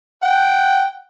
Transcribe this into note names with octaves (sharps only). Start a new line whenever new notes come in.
F#5 G5